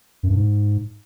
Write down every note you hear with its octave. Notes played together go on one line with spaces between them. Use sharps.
F#2
G2
G#2